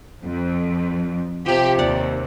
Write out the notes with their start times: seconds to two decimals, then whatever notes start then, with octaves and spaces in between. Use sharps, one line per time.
0.24 F2
1.46 C3 F3 G4
1.79 D#2 D5 F#5